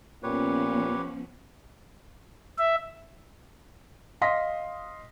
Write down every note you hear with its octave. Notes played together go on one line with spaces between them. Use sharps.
A#2 F3 B3 C#4 G4 B4 C#5
E5
D#5 F5 C6 D#6 A#6 B6